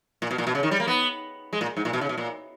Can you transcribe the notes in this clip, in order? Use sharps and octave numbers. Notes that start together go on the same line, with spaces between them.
A#2
B2
A#2
B2
C#3
D#3
G3
A#3
B3
G#3
A#2
G#2
A#2
B2
C#3
B2
A#2